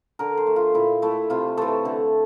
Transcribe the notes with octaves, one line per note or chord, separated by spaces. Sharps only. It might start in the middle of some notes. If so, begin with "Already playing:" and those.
D3 A#4
C5
A3
F4
A#2 E4
A3 E4
C3 F4
E3 A3 A4
D3